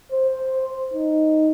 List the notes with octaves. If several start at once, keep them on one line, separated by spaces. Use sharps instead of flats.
C5
D#4